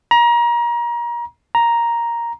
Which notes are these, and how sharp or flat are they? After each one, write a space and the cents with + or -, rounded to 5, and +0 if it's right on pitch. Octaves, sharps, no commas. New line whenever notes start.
A#5 +30
A#5 +5